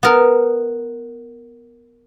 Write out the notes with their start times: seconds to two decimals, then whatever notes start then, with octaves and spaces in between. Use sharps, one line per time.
0.03 B3 A#4